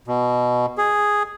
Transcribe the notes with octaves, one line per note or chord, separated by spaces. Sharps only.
B2
G#4